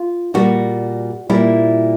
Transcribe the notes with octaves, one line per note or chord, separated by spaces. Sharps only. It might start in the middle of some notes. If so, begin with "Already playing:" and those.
Already playing: F4
A#2 G3 F#4
A#2 G3 E4